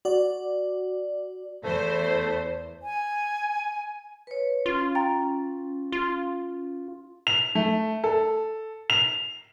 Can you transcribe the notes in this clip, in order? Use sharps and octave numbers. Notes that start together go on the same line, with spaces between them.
F#4 D5
E2 A3 C5
G#5
B4 C#5
C#4 F4
G5 A#5 A6
F4
F7
A3
A4
F7